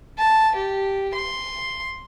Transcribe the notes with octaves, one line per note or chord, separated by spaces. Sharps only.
A5
G4
C6